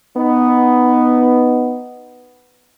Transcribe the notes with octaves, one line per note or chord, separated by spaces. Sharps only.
B3 D#4